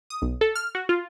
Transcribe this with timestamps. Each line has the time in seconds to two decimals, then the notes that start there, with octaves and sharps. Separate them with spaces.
0.10 D#6
0.22 B1
0.41 A4
0.55 F6
0.75 F#4
0.89 F4